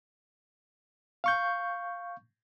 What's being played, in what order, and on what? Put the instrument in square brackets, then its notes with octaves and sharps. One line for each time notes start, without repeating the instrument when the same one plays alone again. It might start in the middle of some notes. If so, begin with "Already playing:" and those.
[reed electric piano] F5 C#6 G6